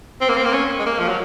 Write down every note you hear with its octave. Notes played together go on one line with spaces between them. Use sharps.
C4
A#3
C4
A#3
C#4
G#3
A#3
F3
F#3